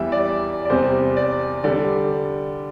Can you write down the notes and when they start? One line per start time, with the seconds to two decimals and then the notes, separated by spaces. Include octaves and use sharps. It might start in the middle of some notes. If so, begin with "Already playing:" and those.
Already playing: E2 E3 G3 E5
0.12 D5
0.65 D5
0.70 E2 C3 G3 C5
1.17 D5
1.64 D3 G3 D5